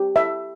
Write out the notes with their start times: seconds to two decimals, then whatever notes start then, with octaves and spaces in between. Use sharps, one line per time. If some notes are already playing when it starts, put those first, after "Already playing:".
Already playing: G4
0.16 E5